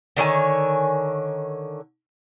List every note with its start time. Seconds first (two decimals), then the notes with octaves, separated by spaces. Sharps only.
0.17 D3 D#3 C#5 G#5